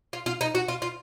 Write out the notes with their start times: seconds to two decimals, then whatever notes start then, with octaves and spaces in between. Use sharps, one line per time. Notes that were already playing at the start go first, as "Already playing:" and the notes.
0.13 F4
0.26 F4
0.41 D#4
0.55 F#4
0.68 F4
0.82 F4